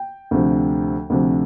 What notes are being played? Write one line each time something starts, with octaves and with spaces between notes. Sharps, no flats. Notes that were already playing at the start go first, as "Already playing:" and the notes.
Already playing: G5
D2 C3 F3
D2 C3 F3